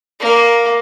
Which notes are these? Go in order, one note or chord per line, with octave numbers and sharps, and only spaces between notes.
A#3